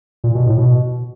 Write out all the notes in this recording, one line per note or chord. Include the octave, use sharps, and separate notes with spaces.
A#2
B2
A2
B2